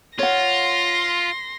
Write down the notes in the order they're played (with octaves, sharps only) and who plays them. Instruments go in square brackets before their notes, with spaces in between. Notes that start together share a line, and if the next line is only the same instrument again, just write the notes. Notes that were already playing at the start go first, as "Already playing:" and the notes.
[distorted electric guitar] F4 [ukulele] C#5 F#5 [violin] C6 A#6